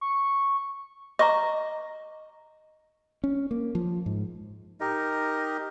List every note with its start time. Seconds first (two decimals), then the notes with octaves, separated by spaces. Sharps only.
0.01 C#6
1.19 D#5 A#5 C#6 D6
3.24 C#4
3.51 A#3
3.75 F3
4.06 G#2
4.81 D#4 G4 A#4 D#5